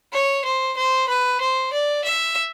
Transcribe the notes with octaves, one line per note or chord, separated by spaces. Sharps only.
C#5
C5
C5
B4
C5
D5
E5